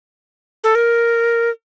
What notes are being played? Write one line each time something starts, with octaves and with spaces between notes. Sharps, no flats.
A4
A#4